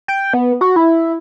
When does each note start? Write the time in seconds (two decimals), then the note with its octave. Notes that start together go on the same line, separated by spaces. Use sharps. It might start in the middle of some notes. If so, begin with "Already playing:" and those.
0.08 G5
0.34 B3
0.61 F#4
0.76 E4